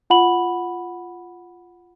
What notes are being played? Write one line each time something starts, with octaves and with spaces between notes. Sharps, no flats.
F4 F#5 B5 F#7